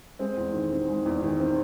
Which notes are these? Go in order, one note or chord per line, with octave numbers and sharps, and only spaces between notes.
G#3 C4
E2
D#3
C4
G#3
E2
D#3
C4